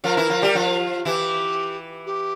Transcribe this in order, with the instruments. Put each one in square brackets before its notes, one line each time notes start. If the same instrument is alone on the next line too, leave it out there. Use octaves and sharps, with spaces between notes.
[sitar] F3 F4 [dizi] A#4
[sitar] E3 E4
F3 F4
G3 G4
F3 F4
[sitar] E3 E4 [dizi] G4
[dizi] G4